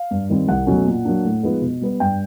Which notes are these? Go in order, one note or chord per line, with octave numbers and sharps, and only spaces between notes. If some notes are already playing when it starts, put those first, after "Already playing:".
Already playing: F5
G2
D#3 G3 C4
C2 F#5
B2 F#3 A3 C#4
A#2
F#3 A#3 D4
A2
F3 G#3 B3 D#4
B2
G3 B3
G2 G5